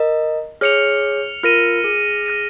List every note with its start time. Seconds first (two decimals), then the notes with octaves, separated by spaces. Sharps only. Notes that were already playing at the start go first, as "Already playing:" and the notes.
Already playing: A#4 D#5
0.61 G#4 C#5 F6 C#7 F7
1.43 F4 A#4 F6 A#6 D#7
1.84 G#4
2.26 F6 A#6 D#7